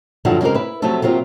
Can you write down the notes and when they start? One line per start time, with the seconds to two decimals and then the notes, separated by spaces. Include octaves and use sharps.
0.25 G2 D3 F3 F#3 E4 F#5
0.41 C#3 G#3 C4 G4 A#4
0.54 E4 B4
0.82 C3 F3 F#3 A3 A4
1.02 C3 F#3 A#3 C4 F4